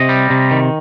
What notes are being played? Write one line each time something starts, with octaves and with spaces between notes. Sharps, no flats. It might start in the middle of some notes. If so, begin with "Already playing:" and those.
Already playing: C3 D#5
G3
C3
D#3